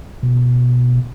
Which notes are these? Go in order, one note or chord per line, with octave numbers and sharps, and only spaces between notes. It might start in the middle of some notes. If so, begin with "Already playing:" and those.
B2